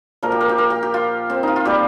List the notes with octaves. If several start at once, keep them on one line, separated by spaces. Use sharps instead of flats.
A#2 F3 A#4
G4
A#4
G4
A#4
G4
G4
F4
C4
D#4 F4
F4
A#2 G3 G4